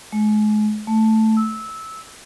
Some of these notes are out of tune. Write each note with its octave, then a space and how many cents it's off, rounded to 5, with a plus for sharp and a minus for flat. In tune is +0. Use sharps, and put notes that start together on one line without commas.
G#3 +40
A3 +0
E6 -15